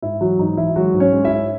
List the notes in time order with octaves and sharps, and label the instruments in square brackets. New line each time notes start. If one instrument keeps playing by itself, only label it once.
[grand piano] G#2 E4
E3 F#3 F#4
G#2 D#4
E3 E4
F#3 G#3 F#4
G#2
C#4 C#5
G#3
E4 E5
G#2